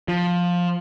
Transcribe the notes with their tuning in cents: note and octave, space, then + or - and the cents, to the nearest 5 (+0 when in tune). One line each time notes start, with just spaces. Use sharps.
F3 +10